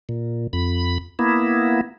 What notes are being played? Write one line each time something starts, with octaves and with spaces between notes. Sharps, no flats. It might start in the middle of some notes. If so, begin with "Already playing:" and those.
A#2
F2 B5
A#3 B3 E4